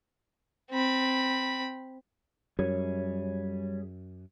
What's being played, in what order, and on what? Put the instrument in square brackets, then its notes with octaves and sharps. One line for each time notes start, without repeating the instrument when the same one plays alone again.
[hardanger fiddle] C4 B5
[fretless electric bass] F#2 [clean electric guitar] G3 G#4 C#5